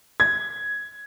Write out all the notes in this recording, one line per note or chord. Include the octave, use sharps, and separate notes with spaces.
G#6